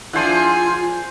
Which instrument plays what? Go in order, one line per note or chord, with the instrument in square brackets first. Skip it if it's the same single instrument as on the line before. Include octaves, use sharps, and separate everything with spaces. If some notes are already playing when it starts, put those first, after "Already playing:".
[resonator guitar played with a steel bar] F3 D4 E4 [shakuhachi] F4 [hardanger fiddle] G#4 G#5 [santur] C5 F#5